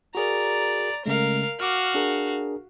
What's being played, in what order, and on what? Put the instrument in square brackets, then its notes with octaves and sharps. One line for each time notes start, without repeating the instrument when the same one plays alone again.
[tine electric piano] F#4 G#4 A#4 [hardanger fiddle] D5 A#5
[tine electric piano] C#3 G#3 A3 [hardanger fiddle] A#4 F5
[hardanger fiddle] F#4 F5 [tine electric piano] D6 F6
[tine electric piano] D4 G#4 A#4